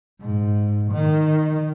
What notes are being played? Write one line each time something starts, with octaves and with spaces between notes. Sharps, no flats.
G#2
D#3